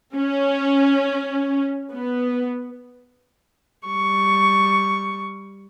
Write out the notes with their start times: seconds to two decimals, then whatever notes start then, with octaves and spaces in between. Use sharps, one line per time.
0.16 C#4
1.92 B3
3.86 G3 C#6